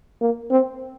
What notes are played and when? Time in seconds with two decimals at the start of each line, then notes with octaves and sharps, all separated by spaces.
0.21 A#3
0.51 C4